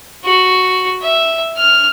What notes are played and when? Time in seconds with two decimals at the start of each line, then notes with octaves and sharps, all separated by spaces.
0.25 F#4
1.02 E5
1.57 F6